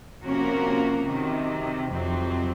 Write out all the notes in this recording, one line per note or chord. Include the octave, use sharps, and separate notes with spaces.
C3 F3 A#3 C#4 F#4 A#4
C3 D#3 F#3
F2 C3 F#3 C4